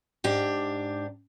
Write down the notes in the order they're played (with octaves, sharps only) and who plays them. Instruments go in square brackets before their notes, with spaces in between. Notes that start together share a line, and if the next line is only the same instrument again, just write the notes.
[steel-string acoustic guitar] G#2 D4 G4